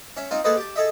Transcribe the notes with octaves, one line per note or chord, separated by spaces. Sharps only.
C#4 E5
C4 D#4 F4
A#3 G#4 A4 B4 C5 D#5
G4 A5
G#4 A4 D#5 E5